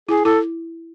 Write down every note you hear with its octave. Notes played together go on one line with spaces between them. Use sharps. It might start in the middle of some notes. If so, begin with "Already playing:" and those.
E4 G#4
E4 A4